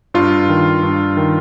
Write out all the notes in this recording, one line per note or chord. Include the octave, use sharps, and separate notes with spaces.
G2 F4
D#3
G2
D#3